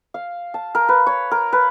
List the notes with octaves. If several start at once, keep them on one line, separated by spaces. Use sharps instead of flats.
F5
A5
A#4
B4
C#5
A#4
B4